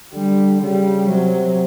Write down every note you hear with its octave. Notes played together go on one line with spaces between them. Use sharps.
D3 G3
C#3 G3
C3 F#3